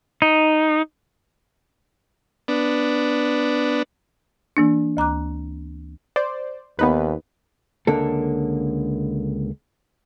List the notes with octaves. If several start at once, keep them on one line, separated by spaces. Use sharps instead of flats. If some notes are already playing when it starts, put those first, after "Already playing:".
D#4
B3 D4
E3 A#3 D4
D2 A#5 D6 F#6
C5 D5
D#2 B3 D#4 B4
C#2 D3 A#3 A4